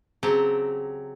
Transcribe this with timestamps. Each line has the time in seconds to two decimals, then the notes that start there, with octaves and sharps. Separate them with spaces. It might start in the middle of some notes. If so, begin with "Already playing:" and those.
0.23 C#3 F#3 C4 G4 A5 A#5